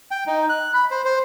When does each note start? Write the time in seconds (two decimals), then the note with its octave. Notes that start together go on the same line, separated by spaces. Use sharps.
0.11 G5
0.27 D#4
0.49 F#6
0.74 B5
0.91 C5
1.05 C5